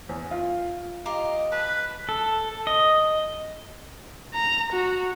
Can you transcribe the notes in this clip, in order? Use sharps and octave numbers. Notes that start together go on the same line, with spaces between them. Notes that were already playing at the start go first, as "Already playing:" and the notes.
E2
F4
F4 G4 D#5 A#5
B4 A5
A4
D#5
A#5
F#4